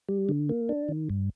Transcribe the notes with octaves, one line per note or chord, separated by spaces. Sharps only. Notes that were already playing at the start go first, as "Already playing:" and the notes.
G3
D3
A#3
D4
D#3
G2